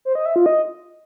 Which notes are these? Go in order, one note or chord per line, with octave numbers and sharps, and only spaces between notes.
C5
D#5
E5
F4
D#5